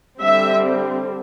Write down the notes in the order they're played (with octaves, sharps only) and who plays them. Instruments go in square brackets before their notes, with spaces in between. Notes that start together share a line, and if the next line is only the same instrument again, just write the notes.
[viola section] D3 G3 C4 E5